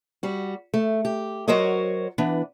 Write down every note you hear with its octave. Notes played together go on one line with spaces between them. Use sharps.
G3 F#4
A3
G4
F#3 F#4 A#4 C5 C#5 D#5
E3 B3 D4